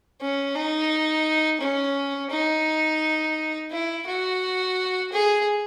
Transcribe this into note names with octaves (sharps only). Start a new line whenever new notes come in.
C#4
D#4
C#4
D#4
E4
F#4
G#4